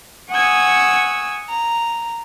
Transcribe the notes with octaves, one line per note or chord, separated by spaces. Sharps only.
F#5 G#5 C#6 D#6 E6 G#6
A#5